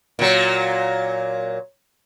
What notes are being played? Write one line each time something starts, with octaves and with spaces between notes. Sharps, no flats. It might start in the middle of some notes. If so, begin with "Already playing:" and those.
A#2 F#3